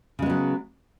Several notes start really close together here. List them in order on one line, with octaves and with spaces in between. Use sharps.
C#3 G#3 B3 F#3